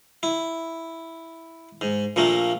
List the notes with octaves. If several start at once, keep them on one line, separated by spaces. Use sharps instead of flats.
E4
G#2
A#1 A#2 A3 A#3